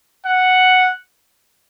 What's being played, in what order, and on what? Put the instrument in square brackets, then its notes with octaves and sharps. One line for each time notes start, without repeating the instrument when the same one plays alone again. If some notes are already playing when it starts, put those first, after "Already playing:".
[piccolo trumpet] F#5